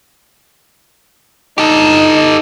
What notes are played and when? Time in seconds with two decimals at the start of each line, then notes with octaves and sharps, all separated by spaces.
1.58 D#4 G4 A4